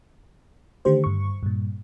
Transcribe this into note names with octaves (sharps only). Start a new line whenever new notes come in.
D3 D#3 A3 G4 C5
G2 C#6
G2 A#2